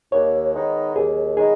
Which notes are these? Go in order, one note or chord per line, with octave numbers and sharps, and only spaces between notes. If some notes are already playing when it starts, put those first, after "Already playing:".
D#2 C#5
D#3 G#3 B3 D#4
D#2 G#4
D#3 G#3 B3 D#4 G#4